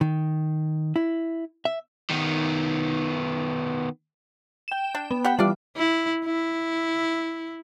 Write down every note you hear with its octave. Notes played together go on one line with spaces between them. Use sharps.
D#3
E4
E5
D#3 B3
G5 E7
D4
B3
G4 F#5 G5
E3 G3 D4 F4 D5
E4
E4